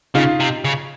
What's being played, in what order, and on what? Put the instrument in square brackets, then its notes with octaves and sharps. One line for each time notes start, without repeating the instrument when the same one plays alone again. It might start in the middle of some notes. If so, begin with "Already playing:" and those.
[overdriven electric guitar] C#3 [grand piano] D#4 F4
[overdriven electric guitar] C3
C#3